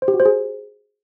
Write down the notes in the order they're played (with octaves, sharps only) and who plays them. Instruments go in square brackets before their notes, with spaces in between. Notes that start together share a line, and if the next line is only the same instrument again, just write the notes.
[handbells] C5
G4
F#4
C5
G#4